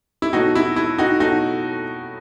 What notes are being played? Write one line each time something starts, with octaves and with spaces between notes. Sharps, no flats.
E4
B2 F#3 A3 D#4 F#4
E4
E4
D#4 F#4
B2 F#3 A3 D#4 F#4